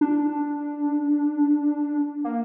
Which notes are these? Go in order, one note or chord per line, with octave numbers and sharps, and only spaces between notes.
D4
A#3